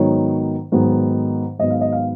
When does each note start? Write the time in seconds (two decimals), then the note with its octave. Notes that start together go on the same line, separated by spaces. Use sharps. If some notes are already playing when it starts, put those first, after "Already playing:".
Already playing: G#2 D#3 F#3 B3 C#5
0.72 G#2 D#3 F#3 B3
1.59 G#2 D#3 F#3 B3 D#5
1.70 F5
1.81 D#5
1.92 F5